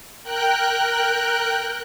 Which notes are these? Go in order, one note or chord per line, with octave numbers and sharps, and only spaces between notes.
A#4 G5 F#6